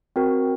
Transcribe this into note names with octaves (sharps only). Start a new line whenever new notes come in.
C4 F#4 A#4